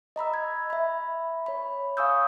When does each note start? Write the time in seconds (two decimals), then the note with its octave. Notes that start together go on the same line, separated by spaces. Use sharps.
0.16 D#5 A#5 B5 E6
0.34 G#6
0.70 E5 B5
1.46 C#5 B5
1.97 F5 G#5 C#6 D#6 E6 G6